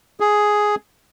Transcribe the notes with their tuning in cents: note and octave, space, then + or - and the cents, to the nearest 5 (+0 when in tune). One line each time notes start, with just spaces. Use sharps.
G#4 +5